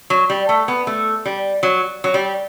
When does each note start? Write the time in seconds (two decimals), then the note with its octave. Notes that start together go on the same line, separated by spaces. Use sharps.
0.10 F#3
0.30 G3
0.49 A3
0.68 B3
0.87 A3
1.26 G3
1.63 F#3
2.04 F#3
2.14 G3